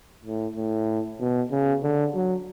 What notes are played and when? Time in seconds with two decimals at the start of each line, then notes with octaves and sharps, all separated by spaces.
0.25 A2
0.56 A2
1.20 B2
1.51 C#3
1.83 D3
2.15 F#3